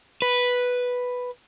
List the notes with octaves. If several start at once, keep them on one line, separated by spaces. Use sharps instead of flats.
B4